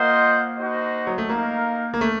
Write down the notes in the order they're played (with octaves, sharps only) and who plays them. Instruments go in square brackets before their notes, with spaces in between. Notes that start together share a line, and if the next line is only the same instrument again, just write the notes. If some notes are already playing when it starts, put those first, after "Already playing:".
Already playing: [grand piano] A#3 [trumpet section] F4 C5 D#5 F#5
[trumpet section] D#4 F#4 C5 D#5
[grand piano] F#3
A3
[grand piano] A#3 [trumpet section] D#4 A#4 F5
[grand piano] A#3
A3